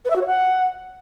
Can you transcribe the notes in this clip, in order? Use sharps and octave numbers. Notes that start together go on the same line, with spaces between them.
B4
E5
F#4
C#5
F#5